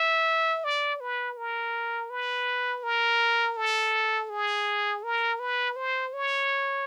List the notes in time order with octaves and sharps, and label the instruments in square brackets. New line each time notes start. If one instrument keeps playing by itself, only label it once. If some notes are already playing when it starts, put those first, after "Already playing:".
Already playing: [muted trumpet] E5
D5
B4
A#4
B4
A#4
A4
G#4
A#4
B4
C5
C#5